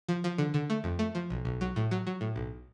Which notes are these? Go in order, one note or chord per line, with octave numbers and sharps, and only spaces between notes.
F3
F3
D3
D3
A3
F2
A3
F3
B1
B1
F#3
A2
F#3
F#3
A2
B1